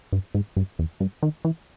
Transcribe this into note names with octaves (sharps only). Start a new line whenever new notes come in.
G2
G#2
G2
E2
G2
D#3
E3